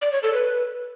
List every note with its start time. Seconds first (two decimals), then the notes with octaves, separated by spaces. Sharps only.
0.02 D5
0.12 C#5
0.23 A4
0.34 B4